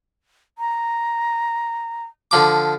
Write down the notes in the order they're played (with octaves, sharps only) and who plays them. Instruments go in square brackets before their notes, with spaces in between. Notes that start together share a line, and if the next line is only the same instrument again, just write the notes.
[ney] A#5
[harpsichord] D3 F3 D6